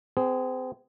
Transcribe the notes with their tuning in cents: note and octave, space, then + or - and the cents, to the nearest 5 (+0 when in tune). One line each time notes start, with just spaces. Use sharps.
C4 -35 G#4 +0